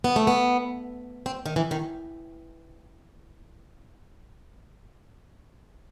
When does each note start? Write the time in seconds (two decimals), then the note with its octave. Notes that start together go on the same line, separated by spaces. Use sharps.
0.04 B3
0.16 A3
0.27 B3
1.26 C4
1.46 D#3
1.56 E3
1.71 D#3